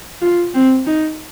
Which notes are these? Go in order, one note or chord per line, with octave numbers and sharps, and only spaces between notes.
F4
C4
D#4